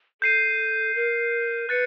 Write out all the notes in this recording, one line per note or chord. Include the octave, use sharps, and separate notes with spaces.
A4 G6 C7 D#7
A#4
B4 F#6 A6 C#7